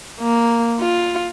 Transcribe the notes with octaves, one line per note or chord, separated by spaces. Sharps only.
A#3
F4